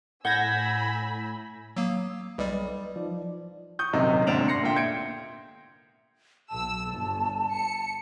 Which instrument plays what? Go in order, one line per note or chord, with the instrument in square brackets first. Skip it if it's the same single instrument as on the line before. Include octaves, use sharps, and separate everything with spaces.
[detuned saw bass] A2 [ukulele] F#5 [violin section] G#5 B5 E6 [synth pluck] G6 G#6 A#6
[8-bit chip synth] F#3 A#3 [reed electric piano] D#6 E6
[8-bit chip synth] B1 G3 [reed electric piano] B4 D5 D#5
[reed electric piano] F3 D#4 D5
[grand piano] C#6 D#6 G6
D#1 F#2 C3 D#4
D2 G#2 C3 D4 D7 F7
C6 A#6 C7 C#7
A#2 D3 E5 G5
G6 G#6 C#7 D7
[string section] B1 E6 [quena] A5
[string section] G1
C#7